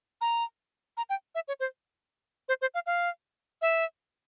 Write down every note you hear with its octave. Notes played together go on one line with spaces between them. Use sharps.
A#5
A#5
G5
E5
C#5
C5
C5
C5
F5
F5
E5